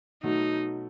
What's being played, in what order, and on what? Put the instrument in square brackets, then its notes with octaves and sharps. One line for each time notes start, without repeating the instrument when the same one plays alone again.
[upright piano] B2 F#3 A3 [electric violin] D#4